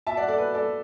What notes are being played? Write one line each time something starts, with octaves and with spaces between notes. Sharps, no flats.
E5 A5
D5 F#5
A4 D5
B4
A4 D5